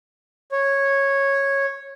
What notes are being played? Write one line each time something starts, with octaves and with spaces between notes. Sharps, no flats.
C#5